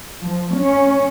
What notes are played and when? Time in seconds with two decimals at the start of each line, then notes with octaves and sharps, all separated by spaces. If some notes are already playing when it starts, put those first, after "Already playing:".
0.21 F3
0.56 C#4